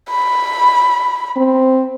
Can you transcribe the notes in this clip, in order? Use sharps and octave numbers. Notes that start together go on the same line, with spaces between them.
B5
C4